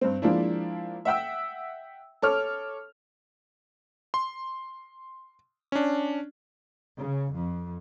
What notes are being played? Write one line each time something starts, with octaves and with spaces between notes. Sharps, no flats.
G2 C4
F3 G#3 A#3 D4 E4
E5 F#5 G5 E6
A4 C#5 D6 F6
C6
C#4 D4
C#3
F2